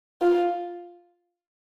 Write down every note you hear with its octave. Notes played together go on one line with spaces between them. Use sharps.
F4